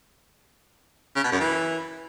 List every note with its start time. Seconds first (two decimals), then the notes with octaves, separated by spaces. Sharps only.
1.16 C#3
1.24 B2
1.32 F#2
1.40 E3